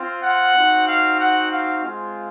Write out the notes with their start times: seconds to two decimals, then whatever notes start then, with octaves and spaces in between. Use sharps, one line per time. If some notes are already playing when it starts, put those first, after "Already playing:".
Already playing: C4 F4
0.24 F#5
0.56 C4 D#4 F#4
0.88 F5
1.19 F#5
1.52 F5
1.83 G#3 C4 F4